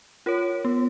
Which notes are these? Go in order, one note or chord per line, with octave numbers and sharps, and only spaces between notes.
F4 A#4 C#5
B3